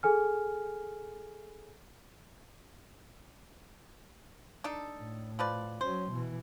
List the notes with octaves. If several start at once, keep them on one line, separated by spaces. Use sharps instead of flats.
G#4 A4 G#5 F6
D4 D#4 A4
A2
F3 B4 D5
F#3 C#4 C5
B2 E3